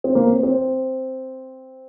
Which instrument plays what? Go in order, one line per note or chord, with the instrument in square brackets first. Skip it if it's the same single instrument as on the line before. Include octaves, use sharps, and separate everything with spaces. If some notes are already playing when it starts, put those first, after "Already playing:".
[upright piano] C4
A#3
C4
C4